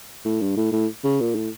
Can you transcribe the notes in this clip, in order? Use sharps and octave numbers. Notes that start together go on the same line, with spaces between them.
A2
G2
A2
A2
C#3
A#2
A2